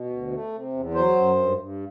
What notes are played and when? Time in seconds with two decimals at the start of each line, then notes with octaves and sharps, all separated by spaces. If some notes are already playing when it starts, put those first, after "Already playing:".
Already playing: B2
0.10 D2
0.31 A3
0.52 C3
0.73 E2
0.94 F#3 C5
1.16 F#2
1.36 G2
1.57 G2